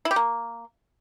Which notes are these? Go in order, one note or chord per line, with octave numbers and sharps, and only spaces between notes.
E4
G4
A#3